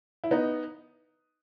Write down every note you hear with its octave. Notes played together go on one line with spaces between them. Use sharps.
E4
B3 D#4